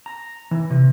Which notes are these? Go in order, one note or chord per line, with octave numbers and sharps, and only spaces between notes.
A#5
E3
C3